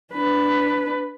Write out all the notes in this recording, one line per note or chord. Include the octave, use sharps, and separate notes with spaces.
D4 B4